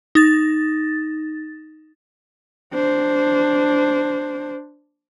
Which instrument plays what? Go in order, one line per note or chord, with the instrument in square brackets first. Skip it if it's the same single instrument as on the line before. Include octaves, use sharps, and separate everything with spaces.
[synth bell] D#4 A6
[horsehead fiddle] D4 C5